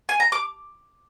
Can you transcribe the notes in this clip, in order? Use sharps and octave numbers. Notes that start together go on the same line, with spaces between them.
G#5
A#5
D6